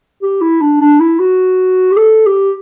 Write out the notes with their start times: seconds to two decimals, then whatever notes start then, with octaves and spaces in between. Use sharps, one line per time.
0.22 G4
0.41 E4
0.61 D4
0.81 D4
1.00 E4
1.19 F#4
1.92 G4
1.97 A4
2.26 G4